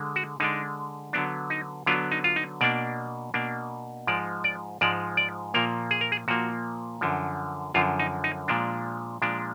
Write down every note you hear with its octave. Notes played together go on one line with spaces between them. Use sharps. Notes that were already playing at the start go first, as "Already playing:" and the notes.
Already playing: D3 G#3
F#4
D3 G#3 D4 D#4
D3 F#3 B3 D4
D#4
D3 F#3 B3 D4 F4
D#4
F4
D#4
B2 A#3 D4 D5
B2 A#3 D4
G#2 F3 G#3 D5
D5
G#2 F3 G#3 D5
D5
A#2 F3 A#3 A#4
G#4
A#4
G#4
A#2 F3 A#3 F#4
F#2 D3 F3
F#2 D3 F3 F4
D#4
D#4
A#2 F3 G#3 D4
A#2 F3 G#3 D4